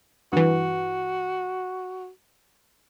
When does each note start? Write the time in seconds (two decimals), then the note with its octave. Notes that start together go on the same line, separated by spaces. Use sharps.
0.33 G2 E3 F#4